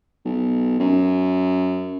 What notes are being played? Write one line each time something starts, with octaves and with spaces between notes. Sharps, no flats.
B1
F#2